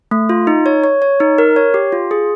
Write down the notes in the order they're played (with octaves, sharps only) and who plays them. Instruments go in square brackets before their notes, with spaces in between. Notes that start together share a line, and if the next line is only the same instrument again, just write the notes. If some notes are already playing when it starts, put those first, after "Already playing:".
[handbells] A3
F4
D#4
C#5
C#5
C#5
D#4
A#4
C#5
G4
F4
G#4